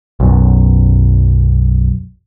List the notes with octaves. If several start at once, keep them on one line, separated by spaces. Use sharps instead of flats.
B1 F#2